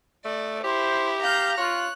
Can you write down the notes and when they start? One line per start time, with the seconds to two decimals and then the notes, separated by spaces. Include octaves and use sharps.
0.25 A3 D5
0.64 E4 G4 C5
1.23 F5 A#5 G6
1.58 F4 C#5 F#6